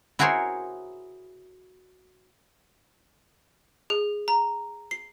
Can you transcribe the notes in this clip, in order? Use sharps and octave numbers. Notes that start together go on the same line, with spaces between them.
E4 F#4 G#4 A#4 C5 C#5
G#4
A#5
C7